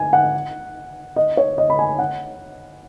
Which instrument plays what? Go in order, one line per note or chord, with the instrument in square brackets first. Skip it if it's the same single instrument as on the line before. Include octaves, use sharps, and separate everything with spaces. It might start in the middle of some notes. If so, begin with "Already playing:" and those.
Already playing: [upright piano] G#5
F#5
D#5
C#5
D#5
B5
G#5
F#5